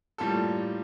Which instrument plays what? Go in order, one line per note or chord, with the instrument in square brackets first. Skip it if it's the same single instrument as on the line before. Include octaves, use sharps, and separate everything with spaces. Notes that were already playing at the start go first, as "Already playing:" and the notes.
[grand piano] A2 G3 A#3 F4 A4